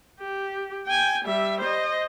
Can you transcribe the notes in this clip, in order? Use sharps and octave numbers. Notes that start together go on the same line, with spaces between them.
G4
G5 G#5
G3 E5
C5 D#5